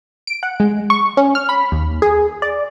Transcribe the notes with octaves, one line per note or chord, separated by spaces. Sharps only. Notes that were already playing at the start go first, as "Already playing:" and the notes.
D7
F#5
G#3
C#6
C#4
F6
B5
D#2
G#4
D5